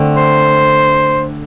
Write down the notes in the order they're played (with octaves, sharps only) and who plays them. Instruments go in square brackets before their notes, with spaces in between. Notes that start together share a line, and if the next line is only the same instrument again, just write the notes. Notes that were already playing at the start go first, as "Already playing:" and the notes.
Already playing: [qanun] D3 A3 C4
[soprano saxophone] C5